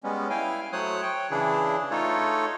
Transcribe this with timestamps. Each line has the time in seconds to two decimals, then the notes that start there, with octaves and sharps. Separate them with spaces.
0.04 G3 G#3 B3 C#4
0.30 E4 F5 G5 G#5
0.73 F#3 A3 C5 C#5 D#6 F#6
1.02 C#5 G5
1.31 C#3 E3 D4 E4 G#4
1.91 A3 D#4 F4 A4 C#5